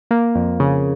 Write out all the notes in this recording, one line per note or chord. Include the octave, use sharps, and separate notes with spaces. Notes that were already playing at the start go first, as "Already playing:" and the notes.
A#3
F2
C#3